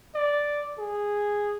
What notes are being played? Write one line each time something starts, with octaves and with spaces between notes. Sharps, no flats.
D5
G#4